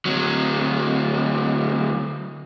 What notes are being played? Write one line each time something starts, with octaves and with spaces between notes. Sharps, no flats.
D2 F#3